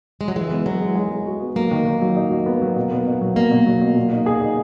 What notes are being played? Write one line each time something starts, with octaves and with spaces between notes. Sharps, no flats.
G#3
F#3
E3 G#3
B3
F#3 B3
G#3
G#3
G#3
F#4
B3
F#3 A#3
D#3
D#4
F#3
D#4
F#3
B3
F#3
B2
B3
B2
F#3
B2 A#3
B2
F#3
B2
A#2
D#4
G#4
D#4